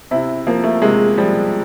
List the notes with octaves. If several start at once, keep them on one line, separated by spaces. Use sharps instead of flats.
C3 E4
F3 A#3
A3
C3 G#3
F3 G3